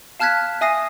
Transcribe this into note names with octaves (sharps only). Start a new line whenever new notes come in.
F5 A5 F6 F#6 G#6 B6
E5 G#5 D#6 A#6 C7 D#7